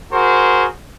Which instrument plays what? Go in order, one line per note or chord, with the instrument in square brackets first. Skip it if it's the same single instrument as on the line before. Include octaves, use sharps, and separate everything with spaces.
[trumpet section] F#4 G#4 A#4 C5